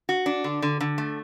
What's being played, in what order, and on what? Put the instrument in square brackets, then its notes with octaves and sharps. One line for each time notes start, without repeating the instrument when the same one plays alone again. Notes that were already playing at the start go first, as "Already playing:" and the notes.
[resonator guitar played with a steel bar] F#4
D4
D3
D3
D3
A3